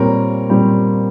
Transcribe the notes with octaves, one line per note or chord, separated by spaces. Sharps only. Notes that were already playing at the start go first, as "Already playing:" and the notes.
Already playing: A#2 G3 C4 A#4 C#5
A#2 G3 C4